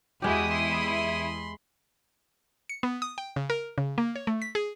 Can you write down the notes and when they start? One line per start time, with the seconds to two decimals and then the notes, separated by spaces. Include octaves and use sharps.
0.22 E2 G#3 E4 F#4 G4 D#6
0.55 B5 C6
2.69 C#7
2.83 B3
3.02 D#6
3.18 G5
3.36 C#3
3.50 A#4
3.78 C#3
3.98 A#3
4.16 C#5
4.27 A3
4.42 B6
4.55 G#4